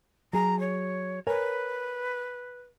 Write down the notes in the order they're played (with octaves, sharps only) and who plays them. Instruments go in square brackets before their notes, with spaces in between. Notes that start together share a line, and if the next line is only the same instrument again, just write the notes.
[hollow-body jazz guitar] F#3 G#4 [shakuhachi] A#5
[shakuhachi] C#5
[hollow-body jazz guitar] A#4 C#5 G#5 [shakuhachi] B4